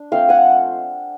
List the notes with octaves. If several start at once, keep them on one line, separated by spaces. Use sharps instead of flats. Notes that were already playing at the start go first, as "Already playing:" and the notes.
Already playing: D4
F3 A3 C4 F4 F5 G5
F#5 G#5